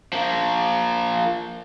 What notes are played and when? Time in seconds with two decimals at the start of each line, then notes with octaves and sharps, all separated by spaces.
0.13 F3 A#3